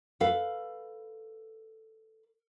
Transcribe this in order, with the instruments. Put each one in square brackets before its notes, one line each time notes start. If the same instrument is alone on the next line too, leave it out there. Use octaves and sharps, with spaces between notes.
[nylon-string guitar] A4 B4 F5